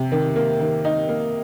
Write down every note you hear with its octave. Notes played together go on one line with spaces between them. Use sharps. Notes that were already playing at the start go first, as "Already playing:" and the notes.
Already playing: C3
D#3
A#3
D#3
D#4
A#3